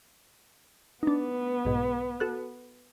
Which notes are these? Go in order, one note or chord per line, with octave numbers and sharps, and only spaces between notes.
B3 D4 D#4
B1 G#2 B2
F#4 A4 F#6